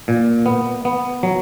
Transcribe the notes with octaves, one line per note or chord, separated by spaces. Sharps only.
A#2
B3
B3
F#3